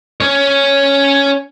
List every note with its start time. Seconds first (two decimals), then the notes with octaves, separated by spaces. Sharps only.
0.20 C#4 C#5